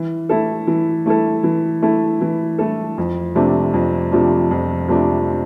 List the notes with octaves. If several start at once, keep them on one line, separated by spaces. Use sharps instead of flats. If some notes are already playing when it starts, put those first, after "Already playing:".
Already playing: E3
A3 E4 A4
E3
A3 E4 A4
E3
A3 E4 A4
E3
A3 E4 A4
F2
C3 F3 A3 D4
F2
C3 F3 A3 D4
F2
C3 F3 A3 D4